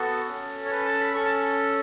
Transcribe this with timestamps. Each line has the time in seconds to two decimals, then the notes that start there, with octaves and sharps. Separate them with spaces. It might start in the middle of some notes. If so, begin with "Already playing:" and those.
Already playing: B3 F#4 A4
0.28 C#4 A4
0.66 C#5
0.71 B4
0.85 A5
0.99 B5
1.14 C#4 A4 C#6
1.25 A5